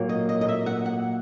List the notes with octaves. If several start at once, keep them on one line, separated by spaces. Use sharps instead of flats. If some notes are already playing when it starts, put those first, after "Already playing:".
Already playing: A#2 F#3 A#3
D#5
D#5
D#5
E5
F#5
F#5